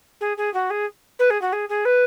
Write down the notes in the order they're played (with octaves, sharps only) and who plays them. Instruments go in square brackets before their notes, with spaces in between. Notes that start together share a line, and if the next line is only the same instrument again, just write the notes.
[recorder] G#4
G#4
F#4
G#4
B4
G#4
F#4
G#4
G#4
B4